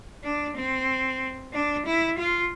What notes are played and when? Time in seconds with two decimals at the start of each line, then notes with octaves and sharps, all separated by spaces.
0.24 D4
0.56 C4
1.53 D4
1.86 E4
2.18 F4